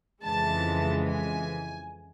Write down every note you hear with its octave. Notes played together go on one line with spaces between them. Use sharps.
F2 C#3 E3 G#3 A5
G#5